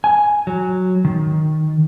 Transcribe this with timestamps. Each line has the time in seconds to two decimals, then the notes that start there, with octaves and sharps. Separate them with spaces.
0.04 G#5
0.47 F#3
1.05 D#3